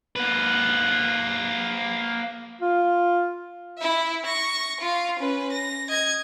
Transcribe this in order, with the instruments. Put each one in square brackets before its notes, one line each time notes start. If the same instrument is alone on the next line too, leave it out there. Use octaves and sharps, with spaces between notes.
[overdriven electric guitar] A#3 B4
[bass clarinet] F4
[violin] E4 E5
C#6 A#6
F4 F5
C#4 B4
A#6
D#5 G#6